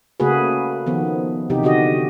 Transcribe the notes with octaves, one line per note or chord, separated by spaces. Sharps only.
C#3 A3 A#3 F#4 G#4 B4
D#3 F3 B3
C3 E3 D#4 G4
D3 F#4 G4 D#5